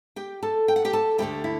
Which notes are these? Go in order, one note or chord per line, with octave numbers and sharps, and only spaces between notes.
G4 G5
A4 A5
G5
F#5
G4 G5
A4 A5
D2 D3 A3 E4 G4 G5
E4